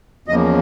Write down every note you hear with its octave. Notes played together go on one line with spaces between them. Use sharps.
E2 C#3 F3 A#3 D#5